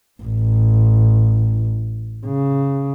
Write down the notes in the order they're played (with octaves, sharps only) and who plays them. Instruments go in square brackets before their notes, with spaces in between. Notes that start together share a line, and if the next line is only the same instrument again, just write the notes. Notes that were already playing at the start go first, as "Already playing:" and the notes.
[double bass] A1
C#3